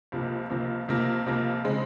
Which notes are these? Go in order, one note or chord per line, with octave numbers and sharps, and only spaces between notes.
C#2 C3 F3 A#3
C#2 C3 F3 A#3
C#2 C3 F3 A#3
C#2 C3 F3 A#3
C#3 G#3 C4